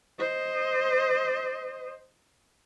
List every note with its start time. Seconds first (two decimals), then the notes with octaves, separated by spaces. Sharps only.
0.19 C5 D#5